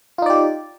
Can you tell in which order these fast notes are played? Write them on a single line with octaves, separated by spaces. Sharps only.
F4 D#4 D5 G4